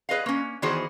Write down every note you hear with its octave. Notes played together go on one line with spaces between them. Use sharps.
G#4 B4 D#5 F5
A#3 C#4
D#3 E3 B3 F#4 G#4 C5